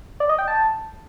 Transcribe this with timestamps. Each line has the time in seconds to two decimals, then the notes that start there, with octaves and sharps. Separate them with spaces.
0.20 D5
0.29 D#5
0.39 G5
0.48 A5